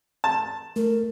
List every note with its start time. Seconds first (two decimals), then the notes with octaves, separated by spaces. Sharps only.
0.24 A5
0.76 A3 A#4